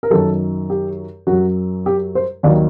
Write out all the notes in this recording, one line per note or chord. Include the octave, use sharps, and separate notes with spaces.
A#4
F#2 D#3 F#3 A4
G4
F#2 F#4
F#3
G4
C5
D#2 D#3 F#3 D5